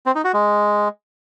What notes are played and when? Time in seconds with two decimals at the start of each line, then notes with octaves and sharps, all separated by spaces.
0.06 C4
0.15 D#4
0.24 F#4
0.34 G#3